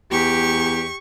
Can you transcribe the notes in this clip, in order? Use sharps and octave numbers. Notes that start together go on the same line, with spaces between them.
E2 G4 C#6